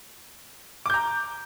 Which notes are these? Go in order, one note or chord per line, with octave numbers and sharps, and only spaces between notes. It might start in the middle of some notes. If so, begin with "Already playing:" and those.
A#5 D6 G6